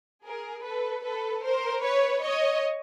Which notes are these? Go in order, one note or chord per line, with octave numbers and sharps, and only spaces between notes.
G#4 A#4
A4 B4
A4 B4
A#4 C5
B4 C#5
C#5 D#5